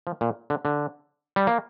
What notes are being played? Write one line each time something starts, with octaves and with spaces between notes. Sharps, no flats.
F3
A#2
D3
D3
G3
A#3